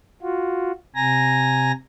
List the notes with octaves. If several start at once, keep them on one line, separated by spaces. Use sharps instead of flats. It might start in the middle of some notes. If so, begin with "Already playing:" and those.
F4 F#4
C3 G#5 A#5 A#6